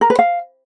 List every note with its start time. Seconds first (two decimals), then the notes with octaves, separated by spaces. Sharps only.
0.01 A#4
0.10 B4
0.19 F5